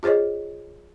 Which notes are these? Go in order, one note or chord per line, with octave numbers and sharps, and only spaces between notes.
F4 G#4 C5 C#5 D#5